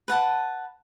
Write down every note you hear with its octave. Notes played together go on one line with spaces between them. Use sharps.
B4 F#5 A5